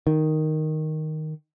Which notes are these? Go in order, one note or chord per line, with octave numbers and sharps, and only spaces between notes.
D#3